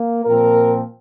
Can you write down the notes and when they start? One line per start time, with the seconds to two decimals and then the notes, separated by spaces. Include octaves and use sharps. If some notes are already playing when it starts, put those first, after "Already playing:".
Already playing: A#3
0.25 A#2 F3 C4 A#4